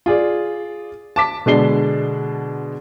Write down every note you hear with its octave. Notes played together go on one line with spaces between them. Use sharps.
F4 G#4 D5
A5 D6 B6
B2 D3 G#3 D4 C7 G7